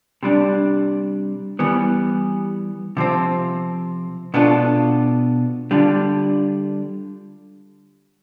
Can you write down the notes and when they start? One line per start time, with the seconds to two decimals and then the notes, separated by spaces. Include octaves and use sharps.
0.23 C3 G3 D4
1.59 E3 G3 B3
2.97 C3 F3 C4
4.34 B2 B3 D4 F4 A4
5.71 D3 G3 D4 F4